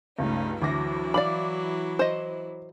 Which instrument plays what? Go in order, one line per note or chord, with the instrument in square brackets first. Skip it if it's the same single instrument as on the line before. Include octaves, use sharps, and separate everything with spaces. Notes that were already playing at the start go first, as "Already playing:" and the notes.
[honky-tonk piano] C#2 G2 [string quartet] A3 C#4 D#4
[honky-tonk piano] D2 D6 A#6 [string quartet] E3 F#3 E4
[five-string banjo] D5 F5 B5 [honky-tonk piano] D6
[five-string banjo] C5 D#5